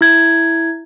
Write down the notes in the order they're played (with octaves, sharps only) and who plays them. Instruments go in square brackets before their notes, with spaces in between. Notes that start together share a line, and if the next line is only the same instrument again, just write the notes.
[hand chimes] E4 G#6